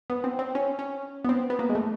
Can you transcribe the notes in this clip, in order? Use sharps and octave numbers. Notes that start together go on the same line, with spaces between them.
B3
C4
C4
C#4
C#4
B3
C4
B3
A#3
G#3
A3